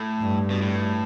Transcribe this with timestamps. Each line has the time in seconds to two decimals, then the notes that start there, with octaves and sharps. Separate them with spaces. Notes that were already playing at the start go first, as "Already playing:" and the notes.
Already playing: A2
0.21 G2
0.50 B2
0.62 A2